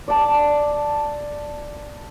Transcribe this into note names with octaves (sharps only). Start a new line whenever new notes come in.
D5 A5